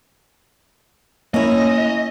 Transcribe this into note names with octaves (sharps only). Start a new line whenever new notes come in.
A#3 C#4 E4 D#5